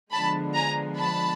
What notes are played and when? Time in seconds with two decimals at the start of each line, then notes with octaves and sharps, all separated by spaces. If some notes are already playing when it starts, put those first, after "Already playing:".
0.12 D3 F3 G#3 B3 D4 A5 B5
0.54 G#5 A#5
0.97 A5 B5